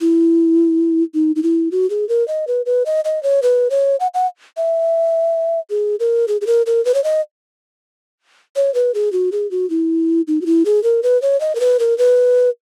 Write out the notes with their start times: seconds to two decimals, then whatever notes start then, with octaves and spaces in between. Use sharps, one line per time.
0.01 E4
1.14 D#4
1.36 D#4
1.43 E4
1.72 F#4
1.90 G#4
2.09 A#4
2.28 D#5
2.47 B4
2.66 B4
2.86 D#5
3.05 D#5
3.23 C#5
3.42 B4
3.70 C#5
4.00 F#5
4.14 F#5
4.57 E5
5.70 G#4
6.00 A#4
6.28 G#4
6.41 G#4
6.47 A#4
6.66 A#4
6.85 B4
6.94 C#5
7.04 D#5
8.56 C#5
8.74 B4
8.94 G#4
9.13 F#4
9.32 G#4
9.51 F#4
9.70 E4
10.27 D#4
10.41 F#4
10.46 E4
10.65 G#4
10.84 A#4
11.03 B4
11.22 C#5
11.41 D#5
11.55 A#4
11.60 B4
11.80 A#4
11.98 B4